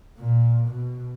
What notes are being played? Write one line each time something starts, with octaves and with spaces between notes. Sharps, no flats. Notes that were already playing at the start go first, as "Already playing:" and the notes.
A#2
B2